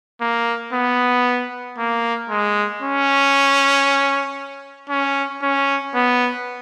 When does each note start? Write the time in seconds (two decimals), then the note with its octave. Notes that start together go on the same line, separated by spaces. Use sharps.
0.21 A#3
0.73 B3
1.78 A#3
2.30 G#3
2.82 C#4
4.90 C#4
5.43 C#4
5.95 B3